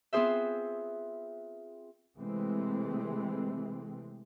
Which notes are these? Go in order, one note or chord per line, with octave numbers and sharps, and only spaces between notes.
B3 C4 F4 G#4 C5 E5
C3 E3 G#3 A3 C4